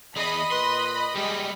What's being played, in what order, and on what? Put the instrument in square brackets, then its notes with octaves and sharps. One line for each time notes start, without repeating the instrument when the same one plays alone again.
[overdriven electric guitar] E2 G#4 [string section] D#5 B5
[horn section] A#2 B4 [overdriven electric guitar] C6
[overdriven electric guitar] G3 G#3 [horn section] G4 G#4